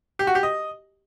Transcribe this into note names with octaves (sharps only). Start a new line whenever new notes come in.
G4
F#4
G4
D#5